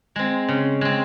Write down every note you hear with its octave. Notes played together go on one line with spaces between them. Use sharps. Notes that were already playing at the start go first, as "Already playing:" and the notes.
G#3 C4
C#3
G#3 C4